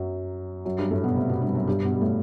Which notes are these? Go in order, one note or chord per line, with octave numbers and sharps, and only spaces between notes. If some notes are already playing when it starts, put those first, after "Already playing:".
Already playing: F#2 F#3
F#2 F#3
G2 G3
A2 A3
B2 B3
C3 C4
B2 B3
G2 G3
F#2 F#3
G2 G3
B2 B3
G3
A2 A3